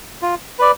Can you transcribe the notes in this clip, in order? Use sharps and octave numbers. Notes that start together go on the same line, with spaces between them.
F4
B4 D5